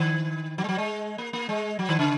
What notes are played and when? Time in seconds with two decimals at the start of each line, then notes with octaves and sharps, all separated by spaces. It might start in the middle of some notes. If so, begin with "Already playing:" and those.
Already playing: D#3
0.58 F#3
0.64 G#3
0.69 F#3
0.78 G#3
1.18 A#3
1.33 A#3
1.49 G#3
1.79 F#3
1.89 D#3
1.99 C#3